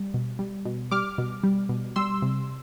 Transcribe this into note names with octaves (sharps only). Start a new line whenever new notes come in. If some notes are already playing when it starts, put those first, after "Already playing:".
Already playing: G3
B2
G3
B2
G3 D6 F6
B2
G3
B2
G3 C6 E6
C3